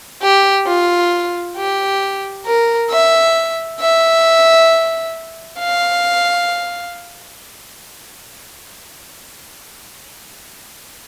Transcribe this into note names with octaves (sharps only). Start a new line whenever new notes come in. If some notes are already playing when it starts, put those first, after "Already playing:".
G4
F4
G4
A#4
E5
E5
F5